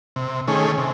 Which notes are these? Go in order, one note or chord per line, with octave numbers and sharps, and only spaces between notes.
C3
D#3 A3 C#4 G#4
C3